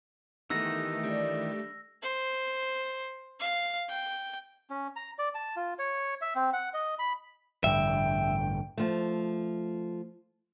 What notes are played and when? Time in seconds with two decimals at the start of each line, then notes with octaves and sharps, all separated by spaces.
0.50 D#3 E3 A3 B3 D#4 G4 E6 A#6
1.03 G3 D4
2.02 C5
3.40 F5
3.89 G5
4.70 C#4
4.96 A#5
5.19 D5
5.35 A5
5.56 F4
5.79 C#5
6.21 E5
6.35 C4
6.53 F#5
6.74 D#5
6.99 B5
7.64 A1 G2 D3 E5 G5
8.78 F3 A3